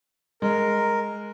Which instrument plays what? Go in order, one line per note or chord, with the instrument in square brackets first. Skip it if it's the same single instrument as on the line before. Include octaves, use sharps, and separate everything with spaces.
[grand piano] G#3 [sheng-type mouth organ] A#4